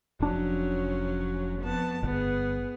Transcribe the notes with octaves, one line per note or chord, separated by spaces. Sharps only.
F1 F3 F#3 C#4 D4
F2 B3 A5
G1 B3 G#4